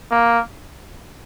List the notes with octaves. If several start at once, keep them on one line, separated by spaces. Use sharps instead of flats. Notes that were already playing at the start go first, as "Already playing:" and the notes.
A#3